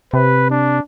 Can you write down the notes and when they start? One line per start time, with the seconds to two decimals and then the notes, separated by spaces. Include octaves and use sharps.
0.13 C3 B4
0.50 D4